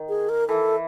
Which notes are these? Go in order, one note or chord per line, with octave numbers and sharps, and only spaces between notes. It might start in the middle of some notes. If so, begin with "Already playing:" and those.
Already playing: D#3
G#4
A#4
E3 A4